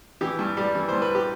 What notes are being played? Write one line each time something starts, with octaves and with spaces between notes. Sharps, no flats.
E3 G4
G2
G3
E3
C5
G2
B4
G4